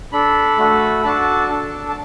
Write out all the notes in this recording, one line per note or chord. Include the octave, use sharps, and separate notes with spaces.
D4 A4 B5
A3 F#4 A4
D4 F#4 A4 A5
D4 A4
A5